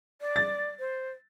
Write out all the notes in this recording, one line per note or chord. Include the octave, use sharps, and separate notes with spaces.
D5
A6
C5